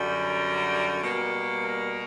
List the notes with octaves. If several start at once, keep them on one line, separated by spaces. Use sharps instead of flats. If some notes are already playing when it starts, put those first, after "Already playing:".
Already playing: F#2 D3 G3
A#4
B2 G3 A#3
A#4